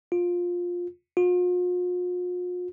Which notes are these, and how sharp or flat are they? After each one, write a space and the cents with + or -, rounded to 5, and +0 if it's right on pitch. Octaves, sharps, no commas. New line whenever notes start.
F4 +15
F4 +45